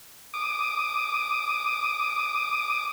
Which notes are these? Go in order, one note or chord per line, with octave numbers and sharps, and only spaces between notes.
D6 D#6